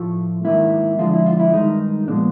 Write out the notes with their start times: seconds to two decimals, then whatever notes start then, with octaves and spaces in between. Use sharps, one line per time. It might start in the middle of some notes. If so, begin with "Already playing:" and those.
Already playing: A2 F3 A3 F4
0.44 G#2 D#3 F#3 A#3 E4
0.99 F2 D3 F3 G#3 F4
1.13 E4
1.26 F4
1.39 E4
1.53 G2 D#3 G#3 D#4
2.08 A#2 F3 G#3 B3 D4